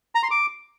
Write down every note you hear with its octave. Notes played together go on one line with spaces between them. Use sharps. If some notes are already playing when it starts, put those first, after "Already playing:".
A#5
C6
D6